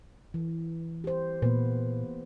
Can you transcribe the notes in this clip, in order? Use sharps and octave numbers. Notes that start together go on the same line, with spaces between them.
E3
G4 C5
A#2 A#3 B3 B4